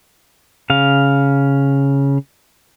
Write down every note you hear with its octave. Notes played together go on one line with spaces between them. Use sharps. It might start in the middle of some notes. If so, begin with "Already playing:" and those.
C#3 F5